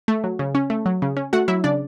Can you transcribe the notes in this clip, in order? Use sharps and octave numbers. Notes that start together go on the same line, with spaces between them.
A3
F#3
C#3
C#4
A3
F#3
C#3
C#4
A3 F#4 F#5
F#3 E4 E5
C#3 D4 D5